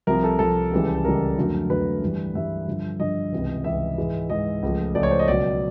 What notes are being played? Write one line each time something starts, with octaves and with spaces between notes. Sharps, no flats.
C2 C3 F3 A#4
A4
C2 C3 F3 A4
C#2 C#3 E3 G3
C#2 C#3 E3 G3 A#4
F2 D3 F#3 A3
F2 D3 F#3 A3 B4
G2 E3 G3
G2 E3 G3 E5
G2 D3 F3
G2 D3 F3 D#5
C#2 C3 E3
C#2 C3 E3 E5
G#2 E3 G#3
G#2 E3 G#3 D#5
C#2 C#3 F3 A3
C#2 C#3 F3 A3 D5
C#5
C5
D#5
C#2 B2 F#3 D5